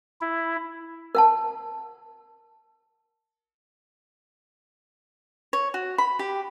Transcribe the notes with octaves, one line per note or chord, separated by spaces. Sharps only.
E4
A#4 F#5 A5
C#5
F#4
B5
G4